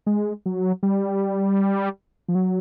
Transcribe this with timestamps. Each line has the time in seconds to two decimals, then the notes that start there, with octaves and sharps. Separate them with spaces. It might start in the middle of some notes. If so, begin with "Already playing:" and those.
0.06 G#3
0.46 F#3
0.83 G3
2.29 F3
2.35 F#3